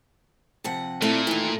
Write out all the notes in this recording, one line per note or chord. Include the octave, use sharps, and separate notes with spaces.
C3 F3 F#5
A#2 A3 C4 D4 E4
D#3 E3